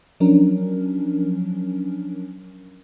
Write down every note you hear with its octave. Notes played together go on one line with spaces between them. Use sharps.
F3 F#3 C#4 D4 A#4